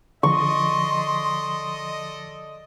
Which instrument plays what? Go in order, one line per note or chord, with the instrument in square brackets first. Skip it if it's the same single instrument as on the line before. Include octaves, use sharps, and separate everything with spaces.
[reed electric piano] D3 F3 [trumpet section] A4 D5 D#5 [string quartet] C6 [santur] C#6